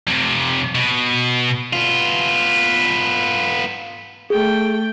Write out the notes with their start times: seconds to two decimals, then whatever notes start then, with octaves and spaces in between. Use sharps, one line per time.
0.07 F2 C3
0.75 B2
1.73 B3 F4
4.30 A3 G#4 G5